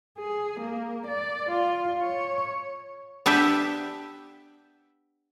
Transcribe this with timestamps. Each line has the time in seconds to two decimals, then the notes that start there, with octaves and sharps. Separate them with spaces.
0.18 G#4
0.61 A#3
1.07 D5
1.50 F4
2.02 C#5
3.26 B3 D4 G4 E5 G5